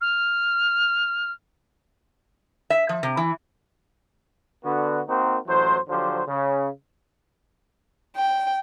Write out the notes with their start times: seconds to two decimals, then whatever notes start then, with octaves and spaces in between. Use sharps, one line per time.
0.01 F6
2.70 E5
2.89 F3
3.03 C3
3.17 E3
4.65 D3 B3 F#4
5.08 A#3 C4 D#4 F#4 A#4 C5
5.46 A1 E3 F#3 C5
5.88 D3 F3 F#3 G4 C5
6.28 C#3
8.17 G5